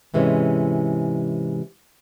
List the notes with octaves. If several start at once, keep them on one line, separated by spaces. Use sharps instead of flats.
G#2 C3 E3 G#3 C4 C#4